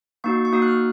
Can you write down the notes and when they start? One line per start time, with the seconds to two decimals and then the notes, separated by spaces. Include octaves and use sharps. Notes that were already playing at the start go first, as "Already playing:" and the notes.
0.24 A#3 D#4 F#4 C#6
0.45 C#6
0.53 A#3 D#4 F#4 D#6
0.62 F#6
0.68 F6